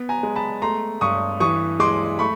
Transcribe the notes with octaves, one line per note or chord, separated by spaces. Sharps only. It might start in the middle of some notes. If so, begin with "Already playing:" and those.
Already playing: B3
G#5 A#5
G#3
A5 B5
A3 A#5 C6
G2 C#6 D#6
E3 C#6 D#6
G#3 C6 D6
A3 B5 C#6